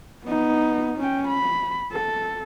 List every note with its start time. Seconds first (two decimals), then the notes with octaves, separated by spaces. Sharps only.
0.25 B3 D#4
0.98 C#4 G5
1.28 B5
1.92 A4